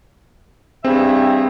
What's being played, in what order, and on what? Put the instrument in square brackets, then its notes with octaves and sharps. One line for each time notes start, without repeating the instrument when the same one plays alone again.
[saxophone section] G2 G#4 E5 [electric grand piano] C4